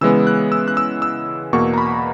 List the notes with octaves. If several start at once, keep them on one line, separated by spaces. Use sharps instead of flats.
C#3 E3 G#3 B3 E6
F#6
E6
F#6
E6
E6
E2 B2 A#3 C#6
A#5
B5